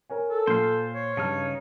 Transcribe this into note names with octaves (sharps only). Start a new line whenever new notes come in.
A#4 C#5 G#5
A4
A#2 C5 F5
C#5
G2 C#3 D#4 A5 F6